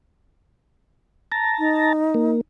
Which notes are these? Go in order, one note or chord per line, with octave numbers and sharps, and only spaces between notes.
A5 A#5
D#4
A#3